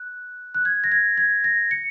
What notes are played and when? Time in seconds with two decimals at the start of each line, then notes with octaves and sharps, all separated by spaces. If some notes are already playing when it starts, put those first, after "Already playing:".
Already playing: F#6
0.55 F#6
0.65 G#6
0.84 A#6
0.92 G#6
1.18 G#6
1.44 A#6
1.71 C#7